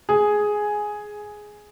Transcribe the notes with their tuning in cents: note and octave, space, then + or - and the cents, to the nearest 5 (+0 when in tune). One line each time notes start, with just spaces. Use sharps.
G#4 +5